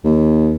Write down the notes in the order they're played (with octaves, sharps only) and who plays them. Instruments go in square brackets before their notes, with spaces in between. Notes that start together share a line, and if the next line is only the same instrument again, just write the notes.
[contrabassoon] D#2